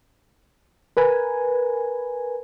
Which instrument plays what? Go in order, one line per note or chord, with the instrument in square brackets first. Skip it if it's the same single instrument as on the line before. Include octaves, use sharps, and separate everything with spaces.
[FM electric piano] A#4 B4 G#5